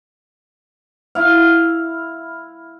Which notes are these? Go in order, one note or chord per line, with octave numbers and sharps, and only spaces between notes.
E4 F5